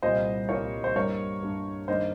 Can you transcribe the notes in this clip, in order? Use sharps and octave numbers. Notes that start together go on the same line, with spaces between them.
C2 A#2 G3 A#3 C5 D#5
C2 A#2 G3 A#3 A#4 C#5
C5
G2 G3 A#3 A#4 C#5
G2 G3 A#3
G2 D#3 A#3 C5 D#5